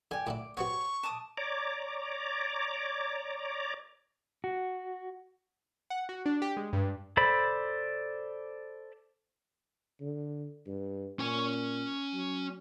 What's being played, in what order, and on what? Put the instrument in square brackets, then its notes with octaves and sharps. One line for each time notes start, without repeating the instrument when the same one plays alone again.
[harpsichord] D3 [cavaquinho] G4 G#5
[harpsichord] A2 D3 E4 [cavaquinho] D6
[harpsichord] B3 C4 F#4 [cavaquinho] C#5 [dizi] C#6
[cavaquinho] A5 D6 D#6
[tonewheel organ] C#5 D5 A#5 D6
[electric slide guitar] F#4
[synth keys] F#5
F#4
D4
G4
G#3
G2
[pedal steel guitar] A4 C5 D5 B5
[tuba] D3
G2
[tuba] A#2 [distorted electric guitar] C#4 G#5
[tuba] F#3